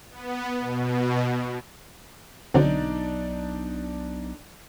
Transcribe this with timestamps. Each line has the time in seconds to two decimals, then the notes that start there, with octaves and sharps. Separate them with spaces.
0.11 B3
0.58 B2
2.54 B1 D3 F#3 C4 D4 D#4 D5